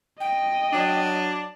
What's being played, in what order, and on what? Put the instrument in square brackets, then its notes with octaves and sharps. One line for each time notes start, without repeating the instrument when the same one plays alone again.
[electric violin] D#5 [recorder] G5
[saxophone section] F#3 D4